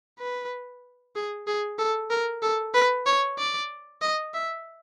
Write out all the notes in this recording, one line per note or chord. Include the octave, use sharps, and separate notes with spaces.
B4
G#4
G#4
A4
A#4
A4
B4
C#5
D5
D#5
E5